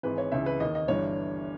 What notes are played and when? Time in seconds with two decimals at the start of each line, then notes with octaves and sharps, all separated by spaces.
0.03 G#1 G#2 E3 B4
0.18 C#5
0.32 C#2 C#3 E3 E5
0.46 B4
0.60 D#2 D#3 D#5
0.75 D#5
0.88 G1 G2 E3 C#5